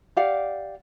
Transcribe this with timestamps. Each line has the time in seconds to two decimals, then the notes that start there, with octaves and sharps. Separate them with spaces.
0.16 G4 D5 F5 F#5